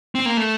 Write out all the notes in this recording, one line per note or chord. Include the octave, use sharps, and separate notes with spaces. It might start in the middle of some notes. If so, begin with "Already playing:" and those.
C4
A#3
A3